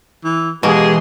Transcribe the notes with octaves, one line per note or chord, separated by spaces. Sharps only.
E3
B2 E3 G#3 A#3 G4 G#4 C6